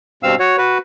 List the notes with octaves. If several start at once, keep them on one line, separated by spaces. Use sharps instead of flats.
G2 B2 C4 F5 E6
F#4 C#5
F#4 B4